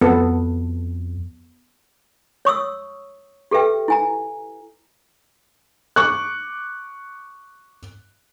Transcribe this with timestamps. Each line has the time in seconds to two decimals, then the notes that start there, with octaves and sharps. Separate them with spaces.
0.01 F2 B3 A4
2.45 C#5 C#6 D#6 E6
3.51 G4 A4 B4 E5 G5
3.88 E4 G#5 A#5
5.96 C#6 D6 F#6